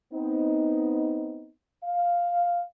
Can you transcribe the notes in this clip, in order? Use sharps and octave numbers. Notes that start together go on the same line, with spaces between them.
B3 C4 D#4
F5